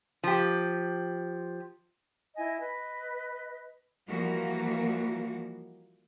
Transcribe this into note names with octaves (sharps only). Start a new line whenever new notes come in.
F3 G4
E4 D#5 G#5
B4 D#5
E3 F3 G3 A#3 F#4